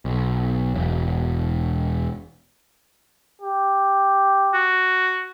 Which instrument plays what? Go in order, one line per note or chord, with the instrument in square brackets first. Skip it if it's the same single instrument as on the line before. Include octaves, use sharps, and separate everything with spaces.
[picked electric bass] B1
E1
[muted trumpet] G4
[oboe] F#4